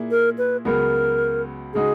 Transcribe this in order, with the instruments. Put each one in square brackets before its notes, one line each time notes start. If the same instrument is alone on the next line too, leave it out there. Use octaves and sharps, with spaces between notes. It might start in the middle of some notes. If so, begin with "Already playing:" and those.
Already playing: [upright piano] A#2 A#3 E4 G#4
[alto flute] A#4
B4
[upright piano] C#2 C#3 F#3 B3 [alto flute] A#4
[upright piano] C#3 G#3 D#4 F#4 [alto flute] G#4